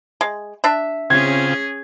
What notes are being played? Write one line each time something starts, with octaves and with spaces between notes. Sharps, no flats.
G#3
D4 E5
C#3 C4 C#4 F4 G#4 G#6